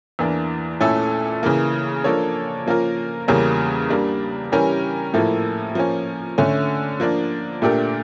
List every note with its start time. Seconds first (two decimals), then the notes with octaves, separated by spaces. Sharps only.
0.19 E2 E3 A#3 D4
0.80 A#2 A3 C#4 E4 A4
1.43 C#3 E3 A#3
2.04 F3 A#3 D4 A4 C#5
2.67 F3 A#3 C#4 F4 A#4
3.28 E2 C#3 G3 A#3 C#4
3.90 G3 A#3 D4
4.52 E3 G3 C#4 G4 A#4
5.14 A2 F3 A#3 E4 A4
5.75 F3 A#3 C#4
6.38 D3 A3 C#4
7.00 F3 A#3 D4
7.62 A#2 A3 D4 G4 A#4